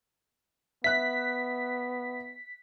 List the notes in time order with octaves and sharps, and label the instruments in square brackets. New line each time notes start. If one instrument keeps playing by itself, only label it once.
[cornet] B3 [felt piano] E5 F#6 [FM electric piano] B6